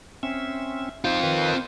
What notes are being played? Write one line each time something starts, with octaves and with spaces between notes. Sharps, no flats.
C4 C#4 E5
C4 D#4 F4 C5
D#3 B4